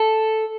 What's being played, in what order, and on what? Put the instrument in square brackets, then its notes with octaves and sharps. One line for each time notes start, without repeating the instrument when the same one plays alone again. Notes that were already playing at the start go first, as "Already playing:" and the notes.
Already playing: [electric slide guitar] A4